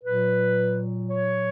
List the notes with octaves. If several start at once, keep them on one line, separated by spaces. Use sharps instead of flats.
A#2 F#3 B4
C#5